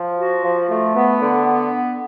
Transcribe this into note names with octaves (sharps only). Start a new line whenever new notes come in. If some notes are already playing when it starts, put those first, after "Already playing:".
Already playing: F3
F#4
F3
A3
B3
D3
B3